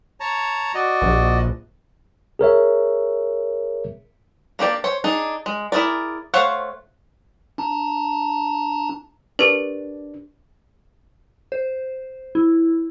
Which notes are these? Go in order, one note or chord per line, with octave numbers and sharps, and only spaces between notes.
C#5 A5 A#5
F#4 D5 D#5
A#1
G#4 A#4 C#5 E5
A#3 D4 G4 D5
C5 C#5
D4 D#4 G#4
G#3
E4 F#4 G#4 A#4 D5
A3 C5 C#5 F5 F#5
D4 A5 A#5
D4 G4 A#4 B4
C5
E4